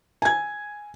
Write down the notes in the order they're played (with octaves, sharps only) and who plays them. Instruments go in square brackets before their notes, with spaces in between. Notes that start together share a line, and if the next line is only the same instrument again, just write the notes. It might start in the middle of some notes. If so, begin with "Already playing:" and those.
[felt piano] G#5 G#6